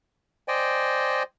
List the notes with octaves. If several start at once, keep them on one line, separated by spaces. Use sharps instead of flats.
C5 D5 D#5 G5 G#5